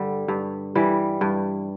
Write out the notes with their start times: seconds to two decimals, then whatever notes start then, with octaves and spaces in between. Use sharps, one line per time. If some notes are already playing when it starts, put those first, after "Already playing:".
Already playing: G2 D3 G3
0.28 G2
0.75 E3 G3
1.21 G2